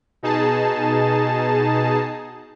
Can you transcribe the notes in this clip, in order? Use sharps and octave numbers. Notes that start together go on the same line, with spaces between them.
B2 D#4 G#4 A5